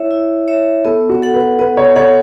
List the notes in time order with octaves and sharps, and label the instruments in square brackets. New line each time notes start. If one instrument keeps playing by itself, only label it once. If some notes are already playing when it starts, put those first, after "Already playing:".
Already playing: [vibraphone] E4 C#5 E5
E4
C#5 E5
[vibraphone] B3 [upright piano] A4
[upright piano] F#4
[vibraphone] A4 F#5
[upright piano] B4
[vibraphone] B3 [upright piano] B4
[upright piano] C#5
[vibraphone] A4 F#5 [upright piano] C#5